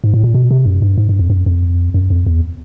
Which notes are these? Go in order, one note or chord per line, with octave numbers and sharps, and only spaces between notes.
G#2
A2
A#2
B2
C3
F#2
G2
G#2
G2
F2
F#2
F2
F#2
F2
E2